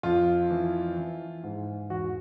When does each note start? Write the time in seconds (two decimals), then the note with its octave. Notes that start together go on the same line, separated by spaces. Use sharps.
0.03 F2 F4
0.50 E3
0.97 E3
1.43 G#2
1.90 E2 F#4